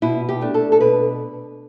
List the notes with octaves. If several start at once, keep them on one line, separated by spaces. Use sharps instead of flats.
B2 E4
G4
A3 D4
A4
A4
B2 B4